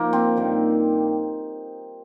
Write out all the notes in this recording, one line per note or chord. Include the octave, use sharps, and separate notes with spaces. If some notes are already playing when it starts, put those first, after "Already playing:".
Already playing: F3 A#3 D#4
C4
G2 D#3 A#3